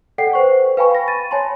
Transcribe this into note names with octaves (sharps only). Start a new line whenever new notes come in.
A4 D5 F#5 G5 C7
B4 C5 C#6
B4 F5 G5 G#5 B5 C#6
B5 A#6
A6 D#7
C#5 G#5 A5 B5 C6